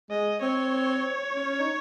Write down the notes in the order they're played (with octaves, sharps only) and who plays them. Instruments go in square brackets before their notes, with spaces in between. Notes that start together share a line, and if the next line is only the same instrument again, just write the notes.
[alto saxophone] G#3 [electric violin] D#5
[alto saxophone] C4 [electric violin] C#5
[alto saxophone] C#4
D#4